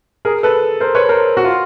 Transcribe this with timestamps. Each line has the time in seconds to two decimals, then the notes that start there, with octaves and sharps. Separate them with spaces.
0.25 G#4 A#4
0.43 A4 B4
0.80 A#4 C5
0.95 B4 C#5
1.09 A#4 C5
1.37 F#4
1.44 F4